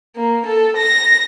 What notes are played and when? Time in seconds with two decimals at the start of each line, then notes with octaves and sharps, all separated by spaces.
0.16 A#3
0.46 A4
0.77 A#6